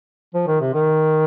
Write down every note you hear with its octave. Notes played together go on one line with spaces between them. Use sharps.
F3
D#3
C3
D#3